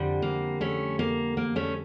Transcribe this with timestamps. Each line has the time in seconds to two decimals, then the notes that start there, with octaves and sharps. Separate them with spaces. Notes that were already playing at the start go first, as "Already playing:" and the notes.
Already playing: F2 D3 G3
0.22 A#3
0.61 A3 C#4
0.99 A#3
1.37 A#3
1.56 A3 C#4